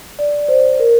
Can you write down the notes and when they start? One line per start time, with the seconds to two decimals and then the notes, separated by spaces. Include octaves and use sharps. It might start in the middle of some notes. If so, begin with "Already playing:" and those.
0.19 D5
0.48 C5
0.80 A#4